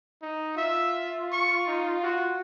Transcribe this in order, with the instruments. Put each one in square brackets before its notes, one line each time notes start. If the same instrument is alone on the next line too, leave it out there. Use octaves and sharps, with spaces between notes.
[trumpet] D#4
[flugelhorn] F4 [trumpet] E5
[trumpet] C#6
D#4
F#4